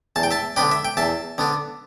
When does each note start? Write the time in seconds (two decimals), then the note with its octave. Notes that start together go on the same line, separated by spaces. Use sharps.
0.16 E2 A5
0.23 G5
0.31 E5 A5
0.56 D3 B3 D4 G5 B5
0.71 E5
0.85 G5
0.97 E2 E5 A5
1.38 D3 B3 D4